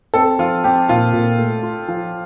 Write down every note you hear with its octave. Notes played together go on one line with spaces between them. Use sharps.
C4 A4
F3 F4
C4 G4
A#2 F4
A#2
A3
F4
F3